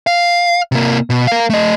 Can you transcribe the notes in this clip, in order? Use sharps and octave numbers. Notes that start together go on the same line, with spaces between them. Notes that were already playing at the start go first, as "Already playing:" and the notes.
F5
C3 A#3
B2
A#4 F5
A3 D#5